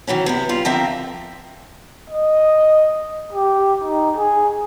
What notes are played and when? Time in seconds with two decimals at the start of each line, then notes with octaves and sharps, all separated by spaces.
0.07 D#3 E3 F#3 C#4
0.26 C3 B3 E4
0.49 G3 F4
0.65 D3 F3 C4 A#4 E5 G5
2.10 D#5
3.33 G4
3.84 D#4
4.17 G#4